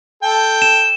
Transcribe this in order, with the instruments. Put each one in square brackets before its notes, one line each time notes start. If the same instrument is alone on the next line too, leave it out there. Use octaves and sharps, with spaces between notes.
[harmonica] A4 G5
[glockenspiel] E7